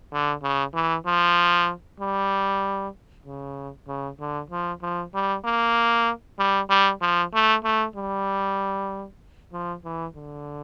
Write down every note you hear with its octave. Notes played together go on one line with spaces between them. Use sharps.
D3
C#3
E3
F3
G3
C#3
C#3
D3
F3
F3
G3
A#3
G3
G3
F3
A3
A3
G3
F3
E3
D3